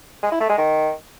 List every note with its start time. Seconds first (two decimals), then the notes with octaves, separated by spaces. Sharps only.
0.23 G#3
0.32 E4
0.40 A3
0.49 G#3
0.58 D#3